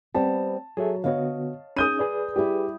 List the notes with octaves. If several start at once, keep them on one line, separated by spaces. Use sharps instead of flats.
G3 B3 C4 A5
F#3 G#4 A4 E5
D3 B3 F#4 C#5 D#5 F5
C#4 D#4 G#4 D#6 G6 D#7
G#4 B4 D5
G3 E4 G4